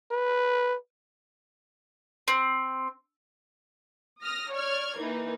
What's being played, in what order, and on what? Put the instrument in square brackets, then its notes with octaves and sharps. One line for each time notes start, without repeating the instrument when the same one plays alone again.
[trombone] B4
[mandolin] C4
[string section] D#6 F6 A#6
C#5 D5 F6 G#6
E3 A#3 D#4